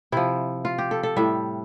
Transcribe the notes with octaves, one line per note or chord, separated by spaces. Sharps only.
C3 F3 E4
F4
G4
A4
A4
A2 G3 E5